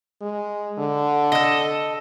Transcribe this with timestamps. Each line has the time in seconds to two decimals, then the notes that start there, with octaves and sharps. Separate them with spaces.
0.22 G#3
0.78 D3
1.32 A4 D#5